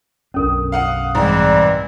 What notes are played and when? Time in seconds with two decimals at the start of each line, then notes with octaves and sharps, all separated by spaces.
0.34 B1 F#2 C#4 D4 A4 A#4
0.72 F5 F#5 D#6
1.15 G#2 E3 G3 C4 D5